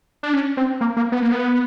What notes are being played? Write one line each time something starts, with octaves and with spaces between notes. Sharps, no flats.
D4
C#4
C4
A#3
A#3
B3
A#3
B3